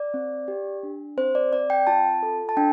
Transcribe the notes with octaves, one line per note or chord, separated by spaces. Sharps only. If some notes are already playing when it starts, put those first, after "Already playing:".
Already playing: D5
C4
G4
D4
C4 C5
D5
C4 D5
G5
F4 A5
A4
A5
D4 G5